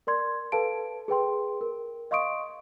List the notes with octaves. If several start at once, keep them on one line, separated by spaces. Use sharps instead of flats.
A#4 D5 C6 G#6
A4 B4 F5 A5 D7
G#4 B4 G5 C6
A#4
D#5 F5 C6 C#6 D#6 D7